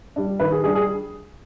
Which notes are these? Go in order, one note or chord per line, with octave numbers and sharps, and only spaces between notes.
G3 D4
D#3 B4
G#4
G3 D4 G#4
G#4